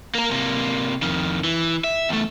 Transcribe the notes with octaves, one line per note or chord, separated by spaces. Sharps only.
A#3 A#4
C3 A#3
F2 D#3
E3
E5
E2 A3